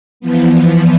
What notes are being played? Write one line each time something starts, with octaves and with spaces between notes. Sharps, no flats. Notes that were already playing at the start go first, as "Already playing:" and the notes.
E3 F3 B3